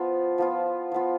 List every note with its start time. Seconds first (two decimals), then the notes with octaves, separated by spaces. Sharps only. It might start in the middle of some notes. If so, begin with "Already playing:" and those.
Already playing: F3 B3 F4
0.38 F3 B3 F4
0.92 F3 B3 F4